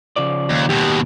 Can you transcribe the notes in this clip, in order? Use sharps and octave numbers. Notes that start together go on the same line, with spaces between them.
C#3 F3 D5
D#2
D#2 B2 G4